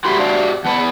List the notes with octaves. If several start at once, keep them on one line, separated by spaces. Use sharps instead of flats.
G3 F#4 G4 E5 B5 C6
D4 F5
E2 B4 F#5 A5